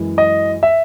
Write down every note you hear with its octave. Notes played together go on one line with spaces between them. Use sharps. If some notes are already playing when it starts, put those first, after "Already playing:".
Already playing: F#2 E3 G#3
D#5
E5